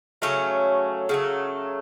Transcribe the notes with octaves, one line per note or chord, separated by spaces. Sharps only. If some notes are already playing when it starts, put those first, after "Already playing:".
C#3 F#3 A3 C#4
C#3 F#3 A3